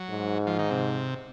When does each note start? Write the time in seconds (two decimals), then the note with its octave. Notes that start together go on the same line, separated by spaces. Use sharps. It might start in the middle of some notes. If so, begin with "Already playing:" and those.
Already playing: F#3
0.10 G#2
0.47 F3
0.59 D#3
0.70 C3